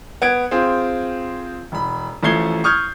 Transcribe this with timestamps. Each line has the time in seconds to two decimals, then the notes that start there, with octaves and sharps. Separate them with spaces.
0.22 B3 G#6 D7
0.51 C4 F4 G#4
1.72 E1 B5
2.23 A1 F3 A3 G#6 C7 G7
2.64 C#6 D#6 F6 G6 G#6